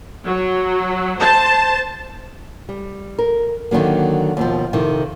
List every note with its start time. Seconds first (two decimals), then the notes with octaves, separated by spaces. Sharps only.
0.24 F#3
1.20 C5 A5
2.69 G3
3.19 A#4
3.71 D3 D#3 F3 F#3 A#3
4.37 D#2 B2 F3
4.73 F2 C3 D#3 E4